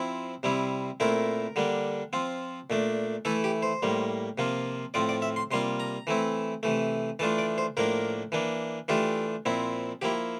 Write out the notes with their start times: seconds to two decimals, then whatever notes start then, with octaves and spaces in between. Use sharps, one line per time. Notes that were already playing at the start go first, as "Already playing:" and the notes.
Already playing: F3 C4 E4
0.43 C3 G3 C4 E4
1.00 A#2 A3 C4 E4 A#4
1.56 D3 G3 A#3 D4
2.13 F3 C4 F4
2.70 A#2 A3 D4
3.25 E3 A3 E4 A4
3.44 G4
3.63 C5
3.82 A2 G3 A#3
4.38 C3 F3 A#3 F4
4.94 A2 F3 C4 F4 D5
5.09 D5
5.22 E5
5.36 C6
5.51 C3 G3 A#3 F4 C6
5.80 A#5
6.07 E3 A3 C4 E4
6.63 C3 E3 A3
7.19 E3 A3 D4 F4 A5
7.38 D5
7.58 C5
7.77 A2 F3 A#3 D4 A#4
8.32 E3 A#3 D4
8.88 E3 A3 D4 F4 G4
9.46 A#2 F3 C4 E4
10.02 F3 A#3 E4 G4